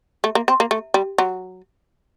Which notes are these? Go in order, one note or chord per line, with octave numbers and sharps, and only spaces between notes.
A3
A#3
C4
A#3
A3
G3
F#3